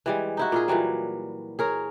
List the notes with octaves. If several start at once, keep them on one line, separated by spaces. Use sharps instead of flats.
E3 G3 G#3
D#4 E4 F#4
A#2 F4 G#4
A#2 E3 F#3 G3
G#4 A#4 C#5